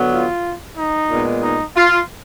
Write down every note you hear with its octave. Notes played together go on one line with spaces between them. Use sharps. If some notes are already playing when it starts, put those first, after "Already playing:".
Already playing: D3 F#3 B3
F4
D#4
A#2 G#3 B3
D#4
F4